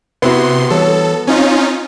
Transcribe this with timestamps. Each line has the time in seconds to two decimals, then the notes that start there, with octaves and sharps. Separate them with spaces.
0.22 C3 B3 E4 F#4 C6
0.70 E3 G3 A4 C#5
1.27 C4 C#4 D#4 F4